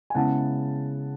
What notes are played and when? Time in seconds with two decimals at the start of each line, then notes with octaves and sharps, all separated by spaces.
0.10 G#5
0.15 C#3 G#3 B3 E4 F#5 A5